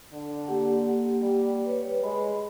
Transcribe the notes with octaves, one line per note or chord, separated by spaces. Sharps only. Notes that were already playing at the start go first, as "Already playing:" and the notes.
D3
A#3 G4 F#5
G3
B4 C#5
G#3 B5